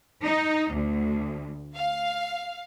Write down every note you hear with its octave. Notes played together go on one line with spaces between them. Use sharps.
D#4
D2
F5